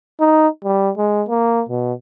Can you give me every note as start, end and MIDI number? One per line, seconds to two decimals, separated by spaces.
0.20 0.48 63
0.64 0.91 55
0.97 1.24 56
1.29 1.63 58
1.69 1.93 47